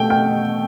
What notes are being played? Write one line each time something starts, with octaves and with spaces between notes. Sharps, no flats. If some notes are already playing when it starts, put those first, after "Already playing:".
Already playing: B2 A3 G5
G5